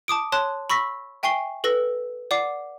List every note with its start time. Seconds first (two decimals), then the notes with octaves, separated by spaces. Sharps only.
0.08 A5 D6 D#6 D7
0.32 C#5 A5 C6 F#6
0.70 B5 C#6 E6 A#6 B6
1.23 E5 G5 G#5 C#6 C7 G7
1.64 A4 B4 E6 A#6
2.31 D5 F#5 D6 C7